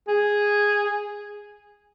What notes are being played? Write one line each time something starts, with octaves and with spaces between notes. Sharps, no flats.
G#4